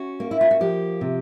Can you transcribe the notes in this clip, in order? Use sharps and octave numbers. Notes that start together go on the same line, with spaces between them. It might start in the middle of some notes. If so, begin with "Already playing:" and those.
Already playing: C#4 F#4
A#3
E4
F4
F#4
F3 G4
C3